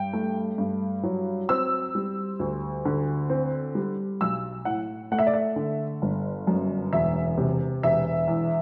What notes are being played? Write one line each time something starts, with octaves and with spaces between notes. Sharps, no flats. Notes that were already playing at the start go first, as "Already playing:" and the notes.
Already playing: G2 G5
A3
G2
F#3
C4 E6
G3
D2
D3
C4
G3
B1 E6
A2 F#5
A3 F#5
E5
D5
E5
D3
G1
F#2
E1 E5
C3
E1 E5
E2